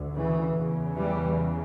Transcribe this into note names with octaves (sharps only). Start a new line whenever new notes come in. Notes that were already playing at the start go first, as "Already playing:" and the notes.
Already playing: D2
C#3 E3
E2 C#3
E3 G3